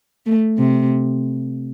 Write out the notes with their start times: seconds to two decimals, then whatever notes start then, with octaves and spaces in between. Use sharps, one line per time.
0.26 A3
0.58 C3